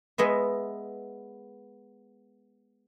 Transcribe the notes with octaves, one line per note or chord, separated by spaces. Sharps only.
G#3 B3 D#5 E5